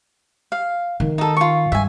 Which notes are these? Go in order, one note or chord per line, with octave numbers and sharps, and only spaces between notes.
F5
D#3
D#4 A4
F4 C#6
G2 E5 G#5